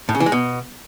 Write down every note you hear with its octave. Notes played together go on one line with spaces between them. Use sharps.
A2
C#3
E3
G#3
B2